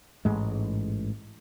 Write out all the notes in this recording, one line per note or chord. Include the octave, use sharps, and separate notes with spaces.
A1 G#2 G#3